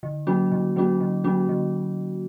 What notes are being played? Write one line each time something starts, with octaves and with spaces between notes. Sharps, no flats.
D3
F#3 A#3 C#4 F#4
D3
F#3 A#3 C#4 F#4
D3
F#3 A#3 C#4 F#4
D3